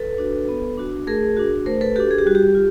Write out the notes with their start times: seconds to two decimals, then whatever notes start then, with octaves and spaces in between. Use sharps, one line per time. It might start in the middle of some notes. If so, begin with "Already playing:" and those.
Already playing: A4 B4
0.18 D4 F#4
0.48 B3
0.77 D4 F#4
1.07 A3 G#4 A#4
1.37 D4 F#4
1.66 A3 A#4 C5
1.81 A4 B4
1.96 D4 F#4 G4 A4
2.11 G#4
2.19 G4
2.25 G3 F#4
2.35 G4
2.55 F4